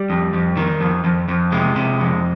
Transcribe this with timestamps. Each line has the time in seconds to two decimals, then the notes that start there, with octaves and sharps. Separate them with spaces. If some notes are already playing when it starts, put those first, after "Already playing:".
Already playing: G3
0.10 F2
0.34 F2
0.57 D#3
0.81 F2
1.04 F2
1.28 F2
1.52 C3 G#3
1.76 C3
2.00 F2